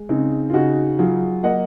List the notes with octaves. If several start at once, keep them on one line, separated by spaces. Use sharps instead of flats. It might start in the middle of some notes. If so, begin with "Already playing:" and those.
Already playing: G#3
C#3 C4 D#4
F4
C#3 D#4 F#4
F#3 F4 G#4
A#3 D#5 F#5